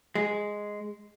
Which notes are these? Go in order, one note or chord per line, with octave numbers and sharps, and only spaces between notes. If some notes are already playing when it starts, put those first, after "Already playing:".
G#3